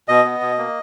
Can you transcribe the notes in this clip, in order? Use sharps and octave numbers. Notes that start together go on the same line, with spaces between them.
B2 D#5
B3
B2
A#3